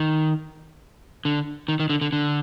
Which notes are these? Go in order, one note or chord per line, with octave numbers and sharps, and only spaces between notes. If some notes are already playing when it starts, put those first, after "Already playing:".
Already playing: D#3
D3
D#3
D#3
D3
D3
D3